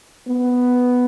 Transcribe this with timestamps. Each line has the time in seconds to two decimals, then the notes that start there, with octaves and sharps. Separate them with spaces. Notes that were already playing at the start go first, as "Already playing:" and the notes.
0.28 B3